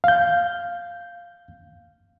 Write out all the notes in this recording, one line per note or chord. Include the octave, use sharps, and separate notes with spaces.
F5 G6